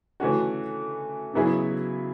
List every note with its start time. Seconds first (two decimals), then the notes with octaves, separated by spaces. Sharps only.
0.20 E3 A3 C#4 F#4
1.33 C#3 F#3 B3 E4 G#4